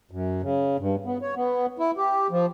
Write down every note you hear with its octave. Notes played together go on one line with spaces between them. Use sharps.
F#2
C#3
G2
B3
C#5
B3
E4
G4
F3